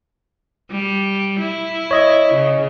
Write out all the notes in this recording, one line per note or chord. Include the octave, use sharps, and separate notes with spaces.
G3
E4
C#5 D#5
C#3